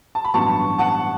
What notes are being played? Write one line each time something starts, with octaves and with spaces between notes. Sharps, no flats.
A5
B5
A1 G2 F#3 B3 A5 C#6
F#5 A5